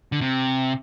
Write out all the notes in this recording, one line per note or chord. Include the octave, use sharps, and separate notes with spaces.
D3
C3